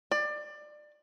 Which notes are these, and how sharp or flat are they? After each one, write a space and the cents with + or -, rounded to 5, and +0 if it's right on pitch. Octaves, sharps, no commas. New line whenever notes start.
D5 +25